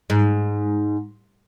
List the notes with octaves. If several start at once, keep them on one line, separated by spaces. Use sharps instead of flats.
G#2